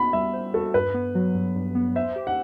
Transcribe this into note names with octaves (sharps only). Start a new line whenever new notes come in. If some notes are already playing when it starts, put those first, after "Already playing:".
Already playing: B3 F#4 B5
G3 E5
C5
F#4 A4
G2 B4
B3
F#3
G2
G2
B3
C5 E5
G4
F#5